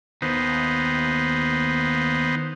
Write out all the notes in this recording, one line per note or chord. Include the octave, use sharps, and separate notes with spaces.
D#2 B3 D#4 C5